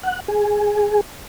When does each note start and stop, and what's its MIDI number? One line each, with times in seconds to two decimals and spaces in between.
0.03 0.20 78
0.28 1.01 68